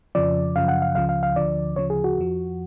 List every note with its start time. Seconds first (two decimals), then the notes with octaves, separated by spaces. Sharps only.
0.15 F2 C#3 F3 D5
0.56 F#2 C#3 F3 F5
0.68 F#5
0.82 F5
0.95 C#2 C#3 F3 F5
1.09 F5
1.23 F5
1.36 D2 D3 F3 D5
1.76 D2 C#3 F3 C#5
1.90 G#4
2.04 F#4
2.18 F2 F3